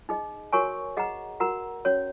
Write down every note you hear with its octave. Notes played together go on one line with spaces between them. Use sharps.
D#4 G#4 D#5
F#4 A#4 C#5 G#5 C#6
G#4 D#5 F#5 A#5
F#4 A#4 F#5 A#5
C#4 F#4 C#5